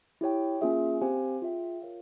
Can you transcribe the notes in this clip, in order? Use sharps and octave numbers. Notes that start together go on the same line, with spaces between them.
E4 G4 C#5 G5
A#3 C#4 F4 G#4 E5
C4 G4 C5 F5 G#5
F4 G#4 E5 G5
F4 A#4 C#5 F5